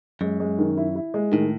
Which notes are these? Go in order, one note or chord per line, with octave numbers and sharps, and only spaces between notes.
F#2 G#3
G#3
D#3
E4
E4
G#3
A2 D#3